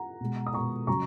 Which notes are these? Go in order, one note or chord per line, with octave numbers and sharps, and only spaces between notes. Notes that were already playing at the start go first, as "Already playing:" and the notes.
Already playing: F#5 A#5
B2 G#3
D#6
B2 G#3 A#5 C#6
C#3 F#3 A#5 C#6